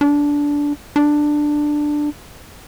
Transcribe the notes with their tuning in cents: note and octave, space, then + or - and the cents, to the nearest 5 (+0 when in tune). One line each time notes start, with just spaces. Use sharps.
D4 -15
D4 +10